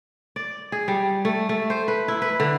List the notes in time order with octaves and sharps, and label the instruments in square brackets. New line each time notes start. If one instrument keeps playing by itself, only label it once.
[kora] D5
G#4
G3
A3
A3
C5
B4
E4
B4
D3